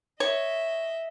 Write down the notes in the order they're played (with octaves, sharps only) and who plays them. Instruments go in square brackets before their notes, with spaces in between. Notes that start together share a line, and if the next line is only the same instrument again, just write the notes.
[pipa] C#5 [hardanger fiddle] D#5 E5